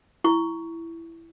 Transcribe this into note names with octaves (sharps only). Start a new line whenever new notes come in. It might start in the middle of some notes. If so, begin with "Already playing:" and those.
E4 C#6